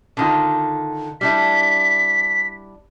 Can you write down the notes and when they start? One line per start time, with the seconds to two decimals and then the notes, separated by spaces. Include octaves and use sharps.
0.17 D3 D#3 F4
1.21 G3 D4 E4 B6